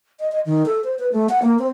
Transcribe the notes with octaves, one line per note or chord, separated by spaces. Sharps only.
D#5
D#5
D#3
A4
C5
B4
A3
F#5
A#3
C4